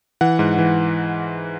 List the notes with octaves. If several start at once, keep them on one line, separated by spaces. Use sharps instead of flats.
E3 F#5
G#2
E3